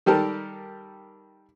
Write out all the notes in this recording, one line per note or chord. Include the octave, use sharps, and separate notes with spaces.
D#3 G3 G4 A4 A#4